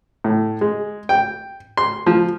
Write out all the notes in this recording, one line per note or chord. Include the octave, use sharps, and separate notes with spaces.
A2
G#3
G5
C6
F3